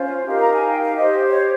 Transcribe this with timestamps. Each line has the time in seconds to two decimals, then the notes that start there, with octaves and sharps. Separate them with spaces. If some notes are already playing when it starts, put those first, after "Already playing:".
Already playing: C#4 F4 C5
0.25 D#4 G4 A#4 F5
0.40 A#5
0.54 G#5
0.68 G5
0.82 F5
0.96 G4 C5 D#5
1.30 C#5